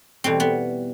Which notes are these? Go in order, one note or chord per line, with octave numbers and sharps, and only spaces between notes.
E2 B2 G3 C4
B3